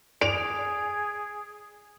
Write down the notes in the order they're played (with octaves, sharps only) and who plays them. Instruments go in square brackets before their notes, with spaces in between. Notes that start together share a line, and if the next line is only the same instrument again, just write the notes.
[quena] G#4 [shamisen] D5 [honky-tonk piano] D7 F7